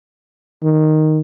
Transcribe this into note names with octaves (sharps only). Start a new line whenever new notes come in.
D#3